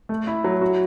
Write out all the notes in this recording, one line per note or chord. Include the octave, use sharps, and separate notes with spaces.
A3
E4
F#3
F#4